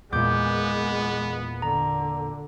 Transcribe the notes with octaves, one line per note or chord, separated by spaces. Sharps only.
E2 A#2 G#3 B3 D6 G6
D3 A#5